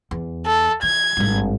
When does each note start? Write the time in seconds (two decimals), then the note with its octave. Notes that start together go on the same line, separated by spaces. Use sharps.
0.11 E2
0.46 A4
0.83 E3 G#6
1.17 G#1 G2